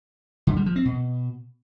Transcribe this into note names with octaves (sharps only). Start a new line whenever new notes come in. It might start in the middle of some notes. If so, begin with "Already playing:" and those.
D3
G3
F3
C4
B2